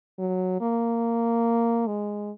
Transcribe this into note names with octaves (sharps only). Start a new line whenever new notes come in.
F#3
A#3
G#3